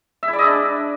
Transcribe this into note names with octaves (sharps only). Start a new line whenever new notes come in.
E5
E4
D5
D#5
D4